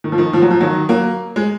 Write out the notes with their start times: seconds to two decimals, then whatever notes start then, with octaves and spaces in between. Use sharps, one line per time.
0.04 D#3
0.12 F3
0.18 D#3
0.33 F3
0.42 F#3
0.51 F3
0.61 D#3 F#3
0.89 F#3 A#3
1.36 G#3